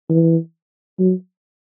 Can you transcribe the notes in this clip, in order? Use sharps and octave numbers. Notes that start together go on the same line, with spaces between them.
E3
F#3